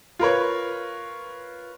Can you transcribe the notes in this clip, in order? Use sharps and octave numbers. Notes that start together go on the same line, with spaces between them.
F4 A#4 B4 C#5